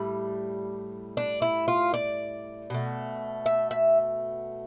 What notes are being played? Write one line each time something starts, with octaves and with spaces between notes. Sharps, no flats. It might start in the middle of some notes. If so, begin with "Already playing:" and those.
Already playing: A2 G3
D4
E4
F4
D5
B2 A3
E5
E5